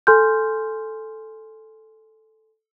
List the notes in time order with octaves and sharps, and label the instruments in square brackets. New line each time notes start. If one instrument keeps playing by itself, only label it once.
[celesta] A4 G#5 C6 F6 G6